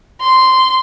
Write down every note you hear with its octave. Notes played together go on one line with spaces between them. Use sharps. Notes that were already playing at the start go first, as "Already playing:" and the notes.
C6